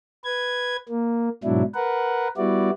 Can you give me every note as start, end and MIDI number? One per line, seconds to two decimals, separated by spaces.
0.24 0.76 71
0.24 0.76 92
0.89 1.29 58
1.44 1.62 44
1.44 1.62 47
1.44 1.62 54
1.44 1.62 62
1.44 1.62 64
1.75 2.28 70
1.75 2.28 71
1.75 2.28 78
2.37 2.70 55
2.37 2.70 59
2.37 2.70 64
2.37 2.70 66
2.37 2.70 74